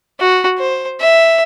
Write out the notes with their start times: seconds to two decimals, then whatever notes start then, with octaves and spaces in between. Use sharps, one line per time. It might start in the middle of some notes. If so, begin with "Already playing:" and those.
0.20 F#4
0.58 C5
1.01 E5